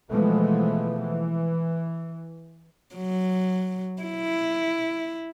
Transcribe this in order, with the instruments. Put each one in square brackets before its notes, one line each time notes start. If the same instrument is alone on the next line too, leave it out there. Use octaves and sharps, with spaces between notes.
[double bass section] B2 E3 F3 G#3 A3 B3
E3
[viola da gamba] F#3
E4